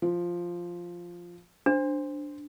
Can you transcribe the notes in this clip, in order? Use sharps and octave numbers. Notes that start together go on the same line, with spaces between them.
F3
D4 C5